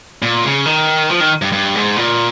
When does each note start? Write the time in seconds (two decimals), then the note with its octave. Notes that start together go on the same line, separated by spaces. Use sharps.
0.22 A#2
0.44 C#3
0.66 D#3
1.10 F3
1.20 D#3
1.42 G2
1.52 G2
1.75 G#2
1.96 A#2